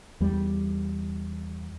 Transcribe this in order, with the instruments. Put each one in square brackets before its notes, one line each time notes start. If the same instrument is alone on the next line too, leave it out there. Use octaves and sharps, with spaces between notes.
[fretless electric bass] E2 G3